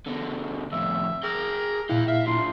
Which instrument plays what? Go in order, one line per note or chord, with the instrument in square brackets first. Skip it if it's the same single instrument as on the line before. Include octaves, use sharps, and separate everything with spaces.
[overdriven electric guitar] B2 D3
[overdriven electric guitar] F2 A2 [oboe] E5
[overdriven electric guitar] G#4 G5 [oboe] A#4
[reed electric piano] A#2 E4 [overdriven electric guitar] F5 G5
[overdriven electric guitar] E5 [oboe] F5
[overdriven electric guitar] D4 F4 [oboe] C6